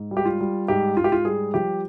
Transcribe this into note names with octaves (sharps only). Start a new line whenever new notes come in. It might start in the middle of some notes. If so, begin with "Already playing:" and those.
Already playing: G#2
G3
G4
F4
G3
G#2 G4
G#2 F4
G4
F4
G3 G#4
F3 G4